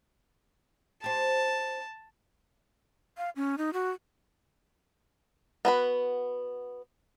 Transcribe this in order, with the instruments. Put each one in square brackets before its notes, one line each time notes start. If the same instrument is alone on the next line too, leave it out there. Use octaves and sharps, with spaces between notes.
[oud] G4 C5 [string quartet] A5
[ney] F5
C#4
D#4
F#4
[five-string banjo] B3 F#4 B4